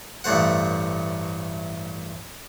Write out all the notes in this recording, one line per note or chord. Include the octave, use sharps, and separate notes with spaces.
A1 G2 A3 C5 F#5